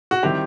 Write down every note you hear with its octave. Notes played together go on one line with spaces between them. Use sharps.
F#4
D#3 G3 C4 E4 G4